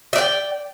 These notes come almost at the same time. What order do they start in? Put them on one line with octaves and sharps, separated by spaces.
E5 D5 G5